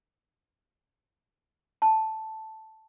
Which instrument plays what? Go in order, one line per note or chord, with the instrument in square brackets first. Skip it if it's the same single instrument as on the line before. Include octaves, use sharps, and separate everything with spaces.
[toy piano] A5